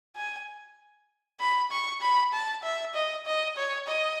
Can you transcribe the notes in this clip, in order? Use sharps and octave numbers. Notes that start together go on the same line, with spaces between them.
G#5
B5
C#6
B5
A5
E5
D#5
D#5
C#5
D#5